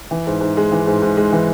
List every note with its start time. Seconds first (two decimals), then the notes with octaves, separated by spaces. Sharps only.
0.11 E3
0.27 G#2
0.41 G#2
0.57 G#3
0.72 E3
0.87 G#2
1.02 G#2
1.17 G#3
1.32 E3